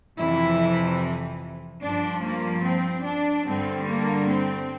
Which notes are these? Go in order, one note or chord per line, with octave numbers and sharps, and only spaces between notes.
F2 C3 E3 E4
G2 F3 D4
A#3
C4
D4
G2 D3 G3 C4
A#3
C4